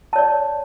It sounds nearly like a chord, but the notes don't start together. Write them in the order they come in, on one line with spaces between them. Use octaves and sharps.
A5 C#5 D5